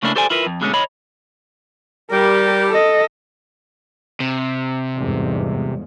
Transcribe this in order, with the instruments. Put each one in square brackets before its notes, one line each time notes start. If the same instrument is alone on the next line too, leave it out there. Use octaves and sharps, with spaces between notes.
[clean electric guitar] C#3 A3 A#3 C#4 D4 E4
G4 A4 C5 D5 G#5
E4 F4 A#4 B4
F2
B2 D3 G#3 A3 B3 C#4
C#5 D#5 B5
[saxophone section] G3 G4 [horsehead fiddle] A#4
[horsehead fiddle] A4 D#5
[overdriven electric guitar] C3
[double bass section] G1 E2 G#2